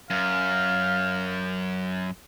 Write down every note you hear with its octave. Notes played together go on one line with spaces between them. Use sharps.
F#2 F5